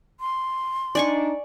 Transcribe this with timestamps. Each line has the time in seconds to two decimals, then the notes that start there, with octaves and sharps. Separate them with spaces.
0.20 C6
0.95 D4 D#4 D5 G#5 C#6